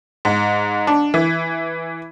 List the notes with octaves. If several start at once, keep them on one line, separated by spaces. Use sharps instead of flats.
G#2
D4
E3